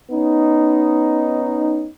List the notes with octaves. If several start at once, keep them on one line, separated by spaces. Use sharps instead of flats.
B3 C#4 D#4